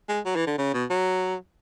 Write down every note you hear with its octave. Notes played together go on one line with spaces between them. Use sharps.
G#3
F#3
E3
D3
C#3
B2
F#3